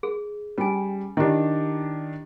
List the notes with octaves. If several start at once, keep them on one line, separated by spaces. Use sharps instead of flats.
G#4
G3 C#4 G#5
D#3 D4 E4 G4